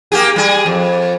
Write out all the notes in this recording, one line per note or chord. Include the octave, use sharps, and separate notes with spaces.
A#3 G4 G#4
G3 G#4
F2